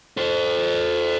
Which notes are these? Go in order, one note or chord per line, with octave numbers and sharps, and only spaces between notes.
A4 C5